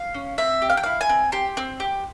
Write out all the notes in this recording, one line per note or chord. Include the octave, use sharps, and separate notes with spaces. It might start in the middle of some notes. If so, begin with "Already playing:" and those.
Already playing: F5
C#4
C4 E5
G4
F5
G5
E4 F5
G#5
C4
G4 C6
C4
G4